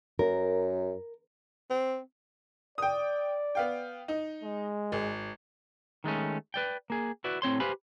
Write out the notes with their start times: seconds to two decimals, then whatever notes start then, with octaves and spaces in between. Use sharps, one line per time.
0.19 F#2 A#4
1.70 C4
2.78 D5 G5 D#6
3.55 B3 F5 G5
4.08 D#4
4.44 G#3
4.92 G#1
6.04 D#3 G#3 A3 C#4
6.54 B4 D5 G5
6.90 A#3 G#4
7.24 E4 F#4 B4 D5
7.42 A2 C4 C#5 C6
7.60 G4 B4 C5 F5 G#5 B5